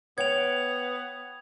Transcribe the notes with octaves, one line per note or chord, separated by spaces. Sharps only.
B3 C#5 G5 G#6 F7